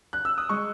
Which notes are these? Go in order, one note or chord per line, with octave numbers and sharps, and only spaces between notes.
F#6
E6
D#6
G#3 C#6